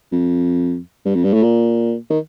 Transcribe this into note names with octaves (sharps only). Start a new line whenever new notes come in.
F2
G2
F2
G2
A2
A#2
D#3